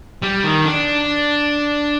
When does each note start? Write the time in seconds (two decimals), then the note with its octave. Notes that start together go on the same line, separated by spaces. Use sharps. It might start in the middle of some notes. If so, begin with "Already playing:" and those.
0.22 G3
0.44 D#3
0.65 D4